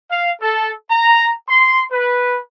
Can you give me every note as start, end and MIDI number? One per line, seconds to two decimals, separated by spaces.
0.10 0.31 77
0.41 0.72 69
0.90 1.32 82
1.49 1.83 84
1.92 2.39 71